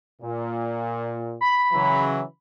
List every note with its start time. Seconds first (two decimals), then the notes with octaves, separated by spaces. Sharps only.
0.21 A#2
1.41 B5
1.73 C#3 E3 F#3